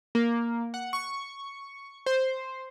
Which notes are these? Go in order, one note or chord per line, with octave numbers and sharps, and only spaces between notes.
A#3
F#5
C#6
C5